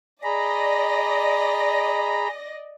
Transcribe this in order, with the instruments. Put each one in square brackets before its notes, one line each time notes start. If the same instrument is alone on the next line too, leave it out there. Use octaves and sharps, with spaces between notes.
[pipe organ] G#4 A#5 B5 [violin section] D5 D#5 A#6